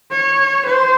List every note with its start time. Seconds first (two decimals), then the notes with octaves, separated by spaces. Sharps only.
0.11 C#5
0.66 C5